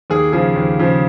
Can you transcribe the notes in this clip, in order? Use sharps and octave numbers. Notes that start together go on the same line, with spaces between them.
D#2 G#4
C#3 F3 G#4
D#2
C#3 F3